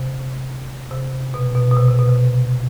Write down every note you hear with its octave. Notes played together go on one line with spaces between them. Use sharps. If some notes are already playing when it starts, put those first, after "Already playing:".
Already playing: C3
C3
B2
B2
B2
C3
C3
B2
C3